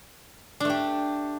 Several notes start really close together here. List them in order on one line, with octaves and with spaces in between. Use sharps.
D4 A3 G4